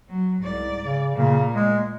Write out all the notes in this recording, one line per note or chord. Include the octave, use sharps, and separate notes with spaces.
F#3
C2 G#2 D5
C#3
A#2 C#3 A#3
G#3